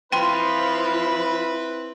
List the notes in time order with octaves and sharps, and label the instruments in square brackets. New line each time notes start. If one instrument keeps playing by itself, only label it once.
[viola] F3 F4 [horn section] C4 E4 B4 [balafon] G5 C6 [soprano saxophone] B5